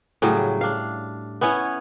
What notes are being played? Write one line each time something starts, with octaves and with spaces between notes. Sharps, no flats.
A2 C#3 F#3 G3
D4 F5
B3 C#4 E4 C#5